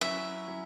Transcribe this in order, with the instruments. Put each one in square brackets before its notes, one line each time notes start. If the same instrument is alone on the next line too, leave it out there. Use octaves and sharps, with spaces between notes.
[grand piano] F#3 C#4 E4 [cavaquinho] E5
[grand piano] F#3 C#4 E4